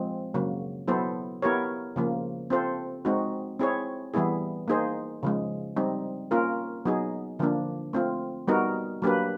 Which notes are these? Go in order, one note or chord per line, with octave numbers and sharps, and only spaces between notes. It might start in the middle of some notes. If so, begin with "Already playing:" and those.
Already playing: F3 G#3 C4
C#3 F#3 A#3
F#3 B3 E4 A4 C5
B3 E4 G4 A#4 C#5
C#3 F3 A#3
C4 F4 A4 C5
G#3 C4 D#4 F#4
C4 E4 G#4 C#5
E3 G3 B3 E4 G#4
A#3 D#4 G#4 C5
C#3 F3 G#3
G3 C4 D#4
A#3 C#4 F4 A#4
F#3 B3 D#4 G#4
D3 F3 A#3 D4
A3 C4 F4
G3 B3 D#4 F#4 A#4
F#3 A#3 D4 G4 B4